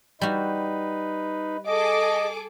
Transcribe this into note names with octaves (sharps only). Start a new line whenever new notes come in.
G3 D#4 F#4 B4
G#4 A4 D#5 D6